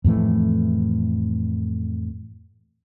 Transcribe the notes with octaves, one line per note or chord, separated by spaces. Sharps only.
F2 A2 E3 A3